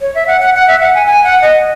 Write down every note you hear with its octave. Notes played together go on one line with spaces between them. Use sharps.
C#5
E5
F#5
F#5
F#5
E5
F#5
G#5
G#5
F#5
D#5